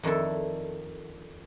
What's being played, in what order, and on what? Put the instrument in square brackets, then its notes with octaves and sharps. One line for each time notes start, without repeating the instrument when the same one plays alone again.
[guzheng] F2 D#3 D4 E4 A4